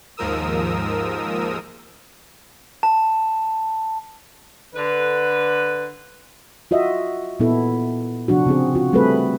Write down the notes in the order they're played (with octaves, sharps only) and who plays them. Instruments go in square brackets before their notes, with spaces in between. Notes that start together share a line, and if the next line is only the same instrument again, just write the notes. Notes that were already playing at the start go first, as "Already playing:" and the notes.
[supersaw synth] D#2 G#2 F3 A#4 D#6 E6
[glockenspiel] A5
[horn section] D3 B4
[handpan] F4 F#4 D#5 E5
A#2 B3 E4 A4
C3 F3 D4 F#4
C#3 C4 G#4
F4 F#4
G3 A3 C4 G#4 A4 B4